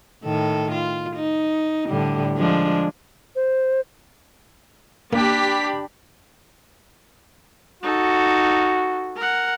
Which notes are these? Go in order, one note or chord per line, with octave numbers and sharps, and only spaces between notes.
A2 D#3 A4
F4
D#4
A2 D3 G3
F3 G#3 D4
C5
A#3 D4 G4 B5 B6
D#4 F#4 A4
A#4 F#5